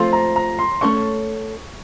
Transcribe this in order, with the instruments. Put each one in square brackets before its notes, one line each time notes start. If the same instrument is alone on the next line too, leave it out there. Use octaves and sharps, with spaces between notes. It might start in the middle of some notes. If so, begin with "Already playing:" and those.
Already playing: [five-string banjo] F3 A3 C4 F4 A4 [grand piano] C6
[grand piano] A#5
A#5
C6
[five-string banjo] A3 C#4 A4 C#5 [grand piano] C#6